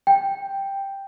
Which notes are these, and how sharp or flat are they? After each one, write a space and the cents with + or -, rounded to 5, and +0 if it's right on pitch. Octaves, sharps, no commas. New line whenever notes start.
G5 +5